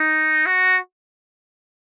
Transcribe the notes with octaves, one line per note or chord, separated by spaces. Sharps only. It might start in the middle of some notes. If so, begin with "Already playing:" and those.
Already playing: D#4
F#4